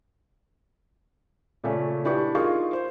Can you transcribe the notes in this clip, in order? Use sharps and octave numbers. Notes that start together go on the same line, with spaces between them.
A#2 C#3 A3 C#4
D4 E4 G4 B4 C#6
D#4 F4 G#4 A#4 F5 C#6
C5